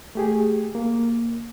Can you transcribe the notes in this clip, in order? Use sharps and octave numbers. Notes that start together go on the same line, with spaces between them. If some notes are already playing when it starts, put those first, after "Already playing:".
A3 G4 G#4
A#3